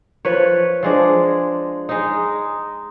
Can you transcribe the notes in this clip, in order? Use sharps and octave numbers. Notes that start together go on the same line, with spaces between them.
F3 B4 C#5
F3 G#3 D4
G#3 D#4